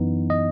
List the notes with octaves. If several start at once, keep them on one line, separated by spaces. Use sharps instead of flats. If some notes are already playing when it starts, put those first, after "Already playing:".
Already playing: F#2 E3 B3 D#4
D#5